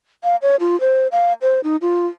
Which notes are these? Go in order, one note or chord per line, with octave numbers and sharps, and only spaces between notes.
F5
C#5
F4
C5
F5
C5
D#4
F4